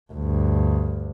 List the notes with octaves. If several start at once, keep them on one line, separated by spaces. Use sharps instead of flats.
D2 G2